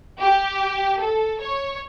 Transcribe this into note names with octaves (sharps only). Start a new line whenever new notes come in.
G4
A4
C#5